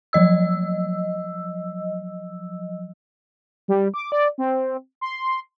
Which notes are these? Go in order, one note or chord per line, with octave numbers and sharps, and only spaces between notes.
F3 F#3 D#5 E6
G3
D6
D5
C4
C6